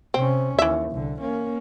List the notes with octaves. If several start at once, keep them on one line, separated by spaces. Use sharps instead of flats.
C3 C4 C#4
D#2 E3 E5
C2 D3
A#3 C#4